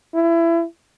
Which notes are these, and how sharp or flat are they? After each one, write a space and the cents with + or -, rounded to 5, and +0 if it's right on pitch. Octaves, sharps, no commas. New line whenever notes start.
E4 +25